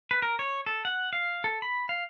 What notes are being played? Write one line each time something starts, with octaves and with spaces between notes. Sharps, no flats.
B4
A#4
C#5
A4
F#5
F5
A4
B5
F5